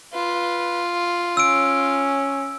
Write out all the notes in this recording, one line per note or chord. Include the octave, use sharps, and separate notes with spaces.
F4 B4
C#4 E6 D7